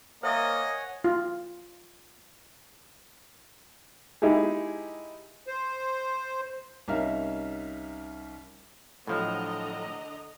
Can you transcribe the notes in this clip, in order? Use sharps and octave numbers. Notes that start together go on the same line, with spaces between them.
A#3 C5 C#5 D#5 E5 F#5 G#5 D#6
F4
G#3 D#4 E4 G4 G#4
C5
C2 C#4 D#4 A#4 E5 F5
A2 D3 F3 F#3 D#5 A#5